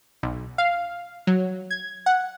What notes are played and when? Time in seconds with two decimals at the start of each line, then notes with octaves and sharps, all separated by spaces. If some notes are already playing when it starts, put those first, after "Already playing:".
0.23 B1
0.58 F5
1.27 F#3
1.70 G#6
2.06 F#5